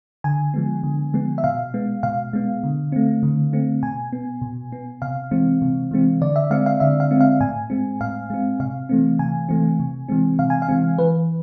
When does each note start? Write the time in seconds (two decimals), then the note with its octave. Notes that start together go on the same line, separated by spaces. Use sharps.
0.24 D3 G#5
0.54 F3 G#3 B3
0.83 D3
1.14 F3 G#3 B3
1.38 E5
1.44 B2 F5
1.74 G#3 B3
2.03 B2 F5
2.33 G#3 B3
2.63 D3
2.92 A3 C4
3.23 D3
3.53 A3 C4
3.83 B2 G#5
4.13 B3
4.42 B2
4.72 B3
5.02 C3 F5
5.31 E3 G#3 C4
5.62 C3
5.91 E3 G#3 C4
6.21 D3 D5
6.36 E5
6.50 G#3 C4 F5
6.66 F5
6.80 D3 E5
7.00 F5
7.11 G#3 C4
7.21 F5
7.40 A2 G#5
7.70 G#3 C4
8.00 A2 F5
8.30 G#3 C4
8.60 C3 F5
8.89 E3 A3 C4
9.19 C3 G#5
9.49 E3 A3 C4
9.80 C3
10.08 E3 G#3 C4
10.39 C3 F5
10.50 G#5
10.62 F5
10.68 E3 G#3 C4
10.98 E3 B4